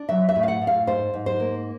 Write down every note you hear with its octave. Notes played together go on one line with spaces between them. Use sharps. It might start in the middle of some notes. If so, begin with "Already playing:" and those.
Already playing: D4
F#3 E5
E5
A2
F5
F#5
A2
F5
G#2 C5
G#2
C5
A#3